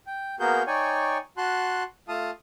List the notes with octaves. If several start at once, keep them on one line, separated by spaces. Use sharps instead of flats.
G5
A#3 B3 F#4 G#4 A#4 G6
D#4 C#5 D5 G5 G#5 C#6
F#4 A5 C6 F#6
A3 F4 F5 A5 D#6